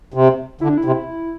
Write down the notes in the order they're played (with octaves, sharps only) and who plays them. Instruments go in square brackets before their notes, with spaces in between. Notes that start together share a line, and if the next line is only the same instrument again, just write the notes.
[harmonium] C3
[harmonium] D3 [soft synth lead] E4
[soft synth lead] D4
E4
[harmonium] C3